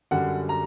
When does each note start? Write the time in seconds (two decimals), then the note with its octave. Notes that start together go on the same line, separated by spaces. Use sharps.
0.11 F#2 D3 G3 F#5
0.49 A#5